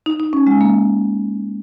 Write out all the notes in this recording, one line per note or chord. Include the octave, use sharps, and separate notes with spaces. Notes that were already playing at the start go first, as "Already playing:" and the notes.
D#4
D#4
C#4
G#3
A#3